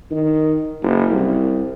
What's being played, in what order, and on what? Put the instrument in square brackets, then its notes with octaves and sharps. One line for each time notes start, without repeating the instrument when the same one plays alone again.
[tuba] D#3
F#1
C2